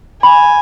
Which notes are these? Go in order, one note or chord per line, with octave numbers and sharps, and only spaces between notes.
G#5 B5